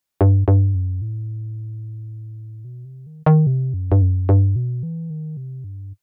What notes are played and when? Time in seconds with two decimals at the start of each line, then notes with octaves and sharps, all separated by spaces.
0.21 G2
0.48 G2
0.75 F#2
1.02 A2
2.65 B2
2.85 C3
3.07 D#3
3.26 D#3
3.47 C3
3.74 F#2
3.92 G2
4.02 F#2
4.29 G2
4.56 B2
4.83 E3
5.10 D#3
5.37 C3
5.64 G2